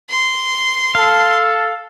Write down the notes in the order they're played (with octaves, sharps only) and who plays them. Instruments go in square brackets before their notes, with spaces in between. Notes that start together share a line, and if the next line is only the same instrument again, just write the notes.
[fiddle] C6
[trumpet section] A4 [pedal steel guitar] F5